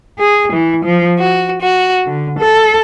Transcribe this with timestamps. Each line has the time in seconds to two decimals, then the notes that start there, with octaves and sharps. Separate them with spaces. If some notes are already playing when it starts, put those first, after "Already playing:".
0.18 G#4
0.53 E3
0.84 F3
1.18 F#4
1.60 F#4
2.06 D3
2.39 A4